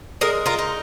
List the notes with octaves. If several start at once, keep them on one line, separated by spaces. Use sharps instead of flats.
G#3 A#4 D#5
F4 A#4
D#4